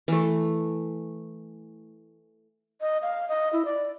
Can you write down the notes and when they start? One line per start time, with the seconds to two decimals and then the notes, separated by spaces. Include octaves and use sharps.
0.08 E3 A3
2.81 D#5
3.02 F5
3.28 D#5
3.53 E4
3.65 D5